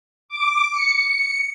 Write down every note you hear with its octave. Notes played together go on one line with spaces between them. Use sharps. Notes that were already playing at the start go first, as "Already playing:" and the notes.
D6
C#7